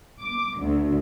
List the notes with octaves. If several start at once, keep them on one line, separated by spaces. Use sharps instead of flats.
D6
D2